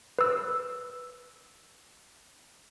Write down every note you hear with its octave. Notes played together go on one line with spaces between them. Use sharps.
B4 E6